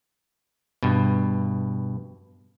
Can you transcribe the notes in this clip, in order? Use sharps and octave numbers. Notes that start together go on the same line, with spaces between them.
G2 B2